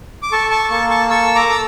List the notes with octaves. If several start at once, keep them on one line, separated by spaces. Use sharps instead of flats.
D6
A4 A5 C#6
A5 C#6
A#3 A5 C#6
A5 C#6
A4 C#6 E6
A#5 D6
A4 E6